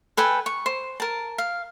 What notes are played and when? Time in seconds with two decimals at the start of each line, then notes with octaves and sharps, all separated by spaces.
0.17 A4 B4 G5 G#5
0.46 C#6
0.66 C5
1.00 A#4 A5
1.38 F5